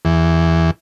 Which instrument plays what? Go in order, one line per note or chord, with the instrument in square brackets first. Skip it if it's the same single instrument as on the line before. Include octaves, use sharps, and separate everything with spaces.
[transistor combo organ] E2